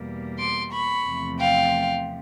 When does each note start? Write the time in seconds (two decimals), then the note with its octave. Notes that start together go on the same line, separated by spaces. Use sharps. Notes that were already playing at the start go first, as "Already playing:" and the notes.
Already playing: E2 B2 G3 A#3
0.39 C6 D6
0.72 B5 C#6
1.06 E2 C3 F3 A3
1.39 F5 G5